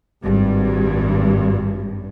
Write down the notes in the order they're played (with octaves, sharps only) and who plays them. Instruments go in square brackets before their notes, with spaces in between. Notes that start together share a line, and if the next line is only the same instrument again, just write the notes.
[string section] G#1 G2